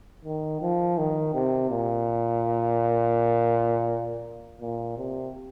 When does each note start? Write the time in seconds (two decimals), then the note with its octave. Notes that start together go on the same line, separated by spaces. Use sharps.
0.25 D#3
0.62 F3
0.98 D#3
1.34 C3
1.71 A#2
4.61 A#2
4.97 C3